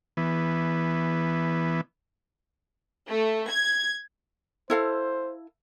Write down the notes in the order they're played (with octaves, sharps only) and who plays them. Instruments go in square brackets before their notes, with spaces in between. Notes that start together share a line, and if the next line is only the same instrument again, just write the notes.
[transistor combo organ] E3 B3
[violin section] A3
G#6
[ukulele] E4 A4 F5 [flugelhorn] C5